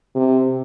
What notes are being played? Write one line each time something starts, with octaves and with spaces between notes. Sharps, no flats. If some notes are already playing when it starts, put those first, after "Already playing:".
C3